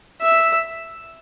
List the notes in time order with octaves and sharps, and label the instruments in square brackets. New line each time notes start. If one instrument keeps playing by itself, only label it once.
[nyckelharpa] E5